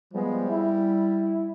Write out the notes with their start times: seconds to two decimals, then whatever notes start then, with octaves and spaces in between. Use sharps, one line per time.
0.14 F3 G3 G#3 B3
0.49 E4